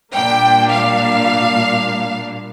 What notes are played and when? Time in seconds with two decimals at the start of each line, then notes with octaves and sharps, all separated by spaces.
0.13 A#2 G3 A#3 D4 G5
0.69 F5